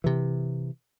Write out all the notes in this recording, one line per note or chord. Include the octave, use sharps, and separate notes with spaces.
C3 E3